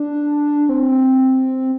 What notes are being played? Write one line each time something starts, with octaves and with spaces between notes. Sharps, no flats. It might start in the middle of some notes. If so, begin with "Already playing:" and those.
Already playing: D4
C4